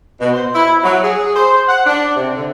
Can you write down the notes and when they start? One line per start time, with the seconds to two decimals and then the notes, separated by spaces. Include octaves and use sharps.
0.20 B2
0.33 C5
0.54 E4
0.83 F#3
1.03 G#4
1.36 C5
1.67 F#5
1.86 D4
2.17 C3
2.36 D3